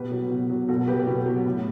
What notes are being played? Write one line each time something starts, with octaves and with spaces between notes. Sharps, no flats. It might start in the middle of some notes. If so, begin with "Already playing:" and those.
Already playing: B2 G4 B4
F#3
B2
F#3
B2 F#4 A4
A4
F#3 G4 B4
B2
F#3
A2